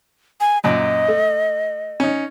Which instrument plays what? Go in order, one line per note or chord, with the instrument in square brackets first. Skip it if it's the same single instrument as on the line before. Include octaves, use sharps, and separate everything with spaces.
[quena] G#5
[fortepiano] F#2 A#2 [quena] D#5
[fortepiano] A3
C#4 D#4